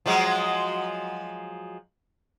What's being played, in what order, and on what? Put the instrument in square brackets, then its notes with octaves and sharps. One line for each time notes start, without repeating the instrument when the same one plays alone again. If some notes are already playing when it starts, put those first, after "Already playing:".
[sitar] F3 F#3 G#3